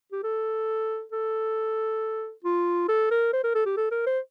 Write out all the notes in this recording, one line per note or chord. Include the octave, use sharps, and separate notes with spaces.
G4
A4
A4
F4
A4
A#4
C5
A#4
A4
G4
A4
A#4
C5